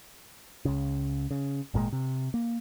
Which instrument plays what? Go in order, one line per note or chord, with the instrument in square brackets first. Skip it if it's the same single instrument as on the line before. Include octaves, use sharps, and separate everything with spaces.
[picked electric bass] C#2 C#3
C#3
G#1 A#2 C#3 G#3
C3
A#3